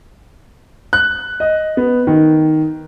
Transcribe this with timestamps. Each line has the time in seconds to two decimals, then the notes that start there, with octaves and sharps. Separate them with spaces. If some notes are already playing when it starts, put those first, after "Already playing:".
0.93 F#6
1.40 D#5
1.77 B3
2.07 D#3